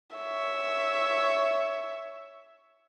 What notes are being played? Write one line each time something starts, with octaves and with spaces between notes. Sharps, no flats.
C#5 E5